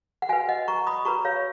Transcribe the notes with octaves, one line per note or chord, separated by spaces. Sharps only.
F#5
F#4 B4 F5 G#5
D#5 F#5
A#5 C#6
B5 D#6
F#4 B4 A#5 C#6
C#5 F5